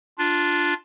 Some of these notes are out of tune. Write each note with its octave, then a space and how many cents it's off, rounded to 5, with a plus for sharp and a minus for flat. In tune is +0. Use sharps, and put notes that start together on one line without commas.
D4 +0 F4 +0